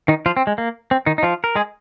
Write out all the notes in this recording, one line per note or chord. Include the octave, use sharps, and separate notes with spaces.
D#3 D#4
F3 F4
C4
G#3
A#3
C4
D#3 D#4
D#4
F3 F4
A#4
G#3 G#4